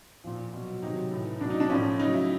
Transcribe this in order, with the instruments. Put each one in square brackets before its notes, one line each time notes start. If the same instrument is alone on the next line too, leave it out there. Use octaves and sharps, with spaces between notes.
[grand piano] A#2 F3
B2 F#3
C3 D#3 F#3 D#4
A2 E3
B2 F#3 D4
D#4
D4
A2 F3 C#4
C#3 F#3 D#4
E4